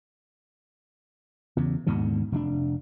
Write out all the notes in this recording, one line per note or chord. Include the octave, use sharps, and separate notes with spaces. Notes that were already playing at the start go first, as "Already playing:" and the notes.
E2 C#3
D#2 G#2 B2 D3
F1 A#2 D4